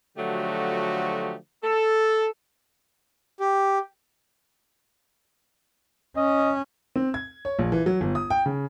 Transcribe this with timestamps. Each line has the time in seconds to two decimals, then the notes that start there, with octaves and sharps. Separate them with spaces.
0.17 D3 F3 F#3 A3 F#4 G4
1.64 A4
3.40 G4
6.16 C#4 D#5
6.96 C4
7.14 G#6
7.45 C#5
7.59 A#1
7.72 E3
7.86 F#3
8.01 G1
8.15 D#6
8.30 G5
8.46 C#3